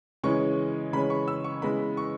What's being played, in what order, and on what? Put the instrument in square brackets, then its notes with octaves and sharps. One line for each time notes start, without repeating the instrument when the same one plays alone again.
[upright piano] C#3 E3 G#3 C#4 C#6
C#3 E3 G#3 C#4 B5
C#6
E6
C#6
C#3 E3 G#3 B3 B5
C#6